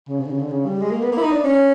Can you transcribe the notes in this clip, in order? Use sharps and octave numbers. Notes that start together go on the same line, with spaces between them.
C#3
C3
D3
C#3
D3
C#3
G3
G#3
A#3
B3
A#3
E4
D#4
D4
C#4